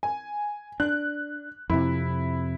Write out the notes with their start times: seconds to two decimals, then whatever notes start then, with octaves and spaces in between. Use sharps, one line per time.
0.03 G#5
0.80 D4 F#6
1.70 F2 C3 E4